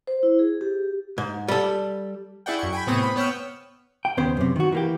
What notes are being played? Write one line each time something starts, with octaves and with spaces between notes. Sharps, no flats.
C5
E4
G#4
G4
G#2
G3 A4
E4 G#4 D5 F#5 G5
F#2 C#6
G5 G#5 B5
A2 C3 B3 C4 C#6 D#6
B5
B3 C#5 G5 E6 F6
G5
D#2 C#3 B3 C5
F#2 C3
D#3 F#4
E3 A#3 G4